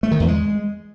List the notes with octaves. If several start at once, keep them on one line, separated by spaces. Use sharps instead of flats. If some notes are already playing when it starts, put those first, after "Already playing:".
A3
D#3
E2
G#3